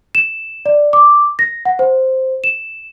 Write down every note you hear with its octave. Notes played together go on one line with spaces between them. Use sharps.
E7
D5
D6
A#6
F#5
C5
E7